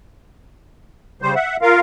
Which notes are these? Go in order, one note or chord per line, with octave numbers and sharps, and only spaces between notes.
C#3 G3 C5
E5 F#5
F4 A#4 F5